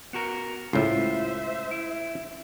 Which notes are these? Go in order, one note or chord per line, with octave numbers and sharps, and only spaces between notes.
B3 F#4 A#4
C#2 A2 F4 C5 E5
E4